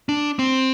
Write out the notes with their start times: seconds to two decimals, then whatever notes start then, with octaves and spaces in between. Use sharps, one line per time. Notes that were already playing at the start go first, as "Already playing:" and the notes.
0.09 D4
0.39 C4